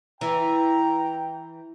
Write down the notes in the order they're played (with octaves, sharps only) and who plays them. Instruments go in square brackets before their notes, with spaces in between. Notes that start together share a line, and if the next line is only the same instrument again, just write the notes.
[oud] E3 [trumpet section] G5 [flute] A#5